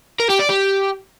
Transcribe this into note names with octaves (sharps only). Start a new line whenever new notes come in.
A#4
G4
D5
G4